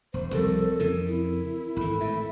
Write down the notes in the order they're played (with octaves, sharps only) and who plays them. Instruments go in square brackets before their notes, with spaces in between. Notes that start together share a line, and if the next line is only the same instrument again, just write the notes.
[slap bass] E1 [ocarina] C5
[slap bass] C2 F3 G3 [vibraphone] C4 A#4 [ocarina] A4
[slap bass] F2 C#3 E3
[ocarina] E4
[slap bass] G#1 E3 [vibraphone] A4 B5
[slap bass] A2 [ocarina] E5